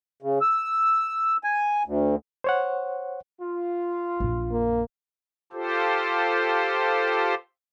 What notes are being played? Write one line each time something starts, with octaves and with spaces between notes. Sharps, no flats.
C#3
E6
G#5
D2
C5 C#5 F#5
F4
A#1 F#2
A#3
F4 G4 A4 C5